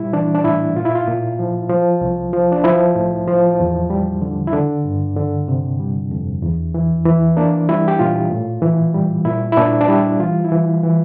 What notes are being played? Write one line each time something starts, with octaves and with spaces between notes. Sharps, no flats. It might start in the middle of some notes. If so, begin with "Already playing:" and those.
Already playing: A#2 G3 E4
E3 D4
D4
A2 E4
A#2 F4
E4
F4
A#2
F3
F3
C2
F3
D4
F3 E4
A2
F3
E2
G3
D3
E4
D3 D4
G2
D3
C3
G3
F2
E2
E3
E3
A#3 D4
G3 E4
G4
A#2 F4
A2
E3
G3
A#2 E4
E4
A#2 D4
D4
G3 E4
E3 F4
E4
E3
E3